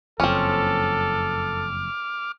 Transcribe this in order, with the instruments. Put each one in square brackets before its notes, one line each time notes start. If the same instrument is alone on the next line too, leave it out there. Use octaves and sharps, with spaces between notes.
[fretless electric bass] F#1 F2 [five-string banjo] C4 C#4 [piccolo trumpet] A4 [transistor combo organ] D6 F6